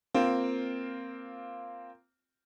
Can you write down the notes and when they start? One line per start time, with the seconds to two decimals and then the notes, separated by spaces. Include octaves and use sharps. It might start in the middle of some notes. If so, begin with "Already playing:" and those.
0.14 A#3 C4 F4